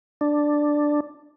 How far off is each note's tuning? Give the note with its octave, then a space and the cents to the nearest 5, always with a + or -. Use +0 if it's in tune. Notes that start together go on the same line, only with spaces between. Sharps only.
D4 +5